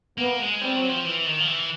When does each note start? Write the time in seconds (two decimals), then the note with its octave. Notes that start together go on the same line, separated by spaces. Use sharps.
0.18 A#3 B3
0.39 G#3
0.61 G3 C4
0.76 F#3
0.89 F3
1.05 E3
1.26 D#3
1.40 F3
1.47 E3